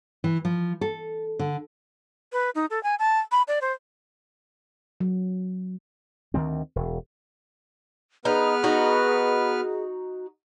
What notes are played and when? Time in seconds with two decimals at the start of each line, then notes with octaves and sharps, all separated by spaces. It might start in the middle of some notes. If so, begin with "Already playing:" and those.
0.24 E3
0.45 F3
0.81 A4
1.39 D3
2.33 B4
2.55 D#4
2.70 A4
2.83 G#5
2.99 A5
3.32 B5
3.48 D5
3.62 C5
5.01 F#3
6.34 D2 D#3 G3 C4
6.76 E1
8.25 B3 D#4 G#4 B4 F6
8.64 D#4 F#4